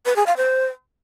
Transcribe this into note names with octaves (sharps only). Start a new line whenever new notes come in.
B4
G#4
F5
C5